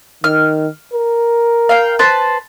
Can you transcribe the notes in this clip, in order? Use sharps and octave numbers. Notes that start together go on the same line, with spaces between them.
D#3 F6
A#4
F5 G5
B4 C5 A5